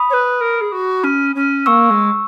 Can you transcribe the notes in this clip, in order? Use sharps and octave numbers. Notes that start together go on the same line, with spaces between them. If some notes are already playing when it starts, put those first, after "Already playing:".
Already playing: B5 D#6
C#5
B4
A#4
G#4
F#4
C#4
C#4
A#3 C#6 E6
G#3